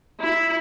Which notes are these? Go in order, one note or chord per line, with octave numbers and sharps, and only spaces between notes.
E4